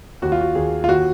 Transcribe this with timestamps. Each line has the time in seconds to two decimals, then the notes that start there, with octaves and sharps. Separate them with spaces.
0.22 D#2 F#4
0.32 F4
0.40 F#4
0.55 D#2 G#4
0.84 F4
0.88 D#2 F#4